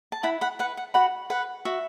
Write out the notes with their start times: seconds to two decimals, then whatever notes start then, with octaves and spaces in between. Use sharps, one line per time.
0.12 A5
0.23 E4 F#5 B5
0.41 F#5 B5
0.59 B4 F#5
0.77 F#5
0.94 F#4 F#5 B5
1.30 B4 F#5
1.65 F#4 E5